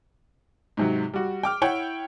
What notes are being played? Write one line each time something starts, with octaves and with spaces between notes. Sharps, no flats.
G#2 C3 F#3
G3 F#4
G5 D6 F6
E4 C#5 F#5 G5